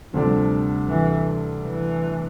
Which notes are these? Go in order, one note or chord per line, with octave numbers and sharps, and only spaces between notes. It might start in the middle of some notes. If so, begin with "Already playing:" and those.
D2 C3 F3 G3 D4
E3
E3